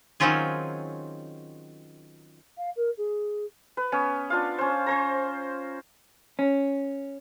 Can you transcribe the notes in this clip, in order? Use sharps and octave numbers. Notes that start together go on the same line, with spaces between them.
D#3 F#3 C4 C#4 F4 G#4
F5
A#4
G#4
B4
B3 C#4
D4 F4 F5
C#4 C5
C#4 C5 A#5
C#4